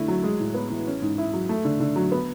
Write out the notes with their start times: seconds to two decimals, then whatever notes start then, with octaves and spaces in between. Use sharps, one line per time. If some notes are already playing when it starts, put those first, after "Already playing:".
Already playing: D3 A3 E4
0.08 F#3
0.23 G#3
0.40 A2
0.55 B3
0.70 E3
0.87 C#4
1.02 G#2
1.18 E4
1.33 F#3
1.49 A3
1.65 D3
1.80 D3
1.96 F#3
2.12 B3